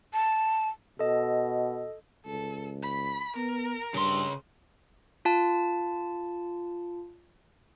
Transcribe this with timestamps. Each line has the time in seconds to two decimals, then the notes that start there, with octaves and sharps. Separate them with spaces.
0.14 A5
0.99 B2 A4 D#5
2.26 C#2 A4
2.83 B5
3.36 B3 A#4
3.94 G2 C#3 C6
5.25 F4 A5